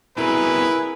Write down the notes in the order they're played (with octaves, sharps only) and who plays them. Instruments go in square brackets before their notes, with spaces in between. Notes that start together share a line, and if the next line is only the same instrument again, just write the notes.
[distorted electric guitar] C2 B2 [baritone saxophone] E4 [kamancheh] G#4 A#4 [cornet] B4